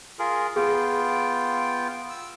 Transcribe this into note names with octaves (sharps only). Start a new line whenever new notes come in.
F4 G#4 A#4
B3 F4 G#4 G5
E6